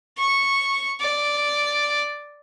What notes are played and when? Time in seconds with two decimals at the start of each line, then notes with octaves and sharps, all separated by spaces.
0.18 C#6
1.01 D5